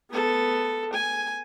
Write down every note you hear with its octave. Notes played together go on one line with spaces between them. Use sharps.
B3 A4
G#5